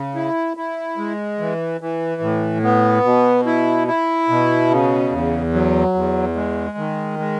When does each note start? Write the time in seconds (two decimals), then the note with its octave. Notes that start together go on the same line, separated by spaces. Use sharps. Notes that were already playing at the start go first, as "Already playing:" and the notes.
Already playing: C#3
0.15 E4
0.57 E4
0.97 G#3
1.39 E3
1.81 E3
2.21 A2
2.64 B3
3.05 B2
3.46 E4
3.88 E4
4.29 B2
4.70 C#3
5.12 E2
5.53 F#3
5.95 E2
6.36 G#3
6.77 D#3
7.19 G#3